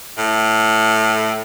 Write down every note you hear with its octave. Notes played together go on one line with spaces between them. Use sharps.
A2